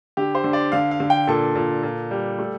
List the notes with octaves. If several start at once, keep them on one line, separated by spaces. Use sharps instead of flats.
D3 G4
C5
D3
D5
D3 F5
F5
D3
G5
A#2 A4
A#2
A#2
G3
A3